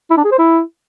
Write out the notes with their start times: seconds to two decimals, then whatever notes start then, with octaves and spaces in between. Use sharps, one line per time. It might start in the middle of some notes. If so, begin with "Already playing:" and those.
0.10 E4
0.17 D4
0.24 G#4
0.31 C5
0.38 E4